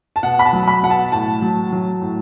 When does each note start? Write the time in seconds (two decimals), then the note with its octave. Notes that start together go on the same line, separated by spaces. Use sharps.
0.16 A5
0.23 B2 F#5
0.39 B5
0.45 A5
0.53 F#3
0.68 B5
0.83 B2 F#5
0.90 A5
1.12 A2 A5
1.42 F#3
1.72 F#3
2.02 A2